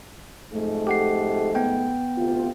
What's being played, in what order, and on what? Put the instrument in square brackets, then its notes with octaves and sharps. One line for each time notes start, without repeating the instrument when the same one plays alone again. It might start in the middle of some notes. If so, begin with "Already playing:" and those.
[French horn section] F2 G#2 A3
[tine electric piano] G4 F#5 C7
B3 G5
[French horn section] D2 C3 F4